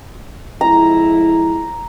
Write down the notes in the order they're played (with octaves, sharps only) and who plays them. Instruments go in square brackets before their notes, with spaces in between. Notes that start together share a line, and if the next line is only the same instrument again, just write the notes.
[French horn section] F2 G#3 E4 [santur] A#5